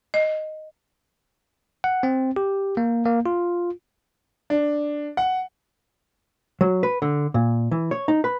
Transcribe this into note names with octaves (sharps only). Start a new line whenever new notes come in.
D#5
F#5
C4
G4
A#3
A#3
F4
D4
F#5
F#3
B4
D3
A#2
E3
C#5
D#4
B4